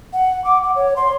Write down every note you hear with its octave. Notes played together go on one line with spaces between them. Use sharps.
F#5
D6
F#5
C#5
C6